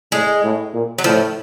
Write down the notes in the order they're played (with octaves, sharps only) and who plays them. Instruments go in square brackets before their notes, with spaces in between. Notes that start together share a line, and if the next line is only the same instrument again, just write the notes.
[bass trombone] A2 [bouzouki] G#3
[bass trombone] A2
A#2
[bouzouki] F#3
[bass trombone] A2 [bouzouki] F3